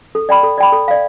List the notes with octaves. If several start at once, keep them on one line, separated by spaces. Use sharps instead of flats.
A4
D5 G5 B5
A4
D5 G5 B5
A4
D5 F5